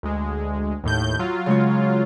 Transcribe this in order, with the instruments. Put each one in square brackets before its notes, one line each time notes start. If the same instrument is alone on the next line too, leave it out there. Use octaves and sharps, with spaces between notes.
[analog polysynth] D2 G#3
D#2 A2 G6
F#3 F4
[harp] C#3 G#3 C#5